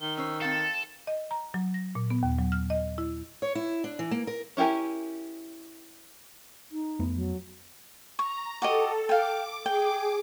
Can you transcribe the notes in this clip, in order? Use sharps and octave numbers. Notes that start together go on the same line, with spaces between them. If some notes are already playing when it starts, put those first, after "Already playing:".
D#3 G7
C#4 C5 E6
C4 A4 F5 A6
D#5
A#5
F#3
A#6
A#2
B3
D#2
F#3
F6
D#5
E4
C#5
E4
D4
E3
A#3
A#4
C#4 E4 G4 A#4 G#5
D#4
F2 A3 B3
F#3
A#5 C#6
F#4 G4 A4 D#5
F5 G5 D6
G#4 G5 D6